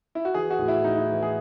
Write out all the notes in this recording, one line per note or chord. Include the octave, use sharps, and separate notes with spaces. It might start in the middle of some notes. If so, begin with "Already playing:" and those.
E4
F#4
E3 G#4
F#4
A2
E4
A2 D#4
E4
E3
G#4